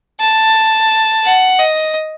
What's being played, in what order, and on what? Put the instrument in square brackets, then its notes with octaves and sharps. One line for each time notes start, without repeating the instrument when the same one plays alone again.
[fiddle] A5
F#5
D#5